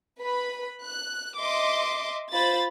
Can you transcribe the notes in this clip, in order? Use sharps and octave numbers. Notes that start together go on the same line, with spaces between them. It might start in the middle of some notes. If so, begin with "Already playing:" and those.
B4 B5
F#6
D#5 E5 C6 D6
F4 C5 B5 A6